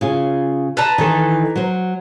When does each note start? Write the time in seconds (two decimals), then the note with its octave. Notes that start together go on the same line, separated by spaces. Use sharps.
0.01 C#3 F4 G#4
0.77 B4 A5 A#5
0.98 D#3 E3 A4
1.55 F#3 C5